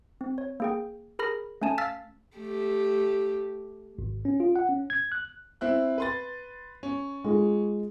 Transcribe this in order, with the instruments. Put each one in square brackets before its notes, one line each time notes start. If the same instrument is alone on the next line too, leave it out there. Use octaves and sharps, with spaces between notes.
[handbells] C4
C#5
A#3 G#4 G5
G#4 A#4 B5 F6 A#6
A3 C#4 G#5 A5
F5 E6 F6 A6 B6
[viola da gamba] A3 G4
[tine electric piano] G#1
C#4
F4
F#5
C#4
G#6
F#6
[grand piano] C4 E4 F#6
B4 C6 A6
C#4
[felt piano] G#3 F4 G#4